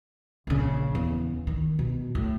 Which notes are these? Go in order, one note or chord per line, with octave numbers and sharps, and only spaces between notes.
A#1 C#3
E2
D#3
B2
A2